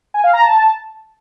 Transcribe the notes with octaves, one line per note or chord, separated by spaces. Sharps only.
G#5
F5
A#5
A5